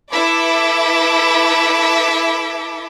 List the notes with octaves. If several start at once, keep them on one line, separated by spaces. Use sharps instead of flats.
E4 A4 B4 E5 D6